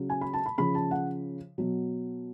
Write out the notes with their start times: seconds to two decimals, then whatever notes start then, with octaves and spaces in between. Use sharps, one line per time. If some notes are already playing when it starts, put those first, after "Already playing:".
Already playing: C#3 F#3
0.10 G#5
0.21 B5
0.33 A5
0.46 B5
0.58 C#3 F3 B5
0.75 A5
0.91 F#5
1.58 B2 F#3